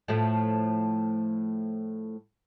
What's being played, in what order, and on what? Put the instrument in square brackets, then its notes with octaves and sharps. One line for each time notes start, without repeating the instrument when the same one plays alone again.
[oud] A2 F3 A3